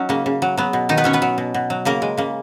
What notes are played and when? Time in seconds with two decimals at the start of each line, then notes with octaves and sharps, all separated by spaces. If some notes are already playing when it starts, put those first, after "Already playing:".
Already playing: F#3 C#4 D#4
0.09 C#3 A#3
0.26 C#3
0.42 F#3
0.57 F#3 B3
0.73 B2
0.89 B2 D#3 D#4
0.97 B3 B4
1.04 F#3 C#4 C#5
1.13 B3 B4
1.22 F#3
1.38 B2
1.54 B2
1.70 F#3
1.85 C#3 A#3 A#4
2.02 G#3
2.17 C#3 A#3